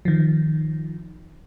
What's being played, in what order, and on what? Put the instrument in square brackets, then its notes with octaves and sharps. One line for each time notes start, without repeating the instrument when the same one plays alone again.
[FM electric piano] D#3 F3